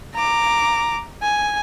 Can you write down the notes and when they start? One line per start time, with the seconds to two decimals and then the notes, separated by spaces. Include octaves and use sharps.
0.15 A#5 D6
1.22 G#5